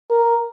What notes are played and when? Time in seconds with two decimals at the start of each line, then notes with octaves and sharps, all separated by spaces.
0.10 A#4